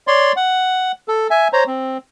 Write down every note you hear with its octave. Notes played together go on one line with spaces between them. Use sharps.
C#5 D5 C6
F#5
A4
E5 G#5
C5 C#5 A#5
C4